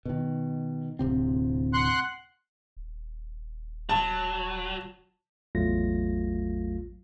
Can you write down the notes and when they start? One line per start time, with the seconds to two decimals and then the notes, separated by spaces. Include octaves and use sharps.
0.05 B2 D#3
0.99 D1 C3 C4
1.73 F#5 C6 F#6
2.77 D#1
3.89 F#3 A5
5.55 A1 E2 F#3 A3 F4 A#6